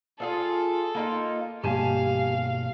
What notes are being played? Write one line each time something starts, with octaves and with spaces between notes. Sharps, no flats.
D4 F4 G#4 A4
A#3 D#4 F4
G2 B2 A#3 G4 F5 G#5 A5